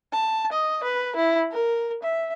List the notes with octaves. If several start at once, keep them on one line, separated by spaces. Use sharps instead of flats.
A5
D#5
B4
E4
A#4
E5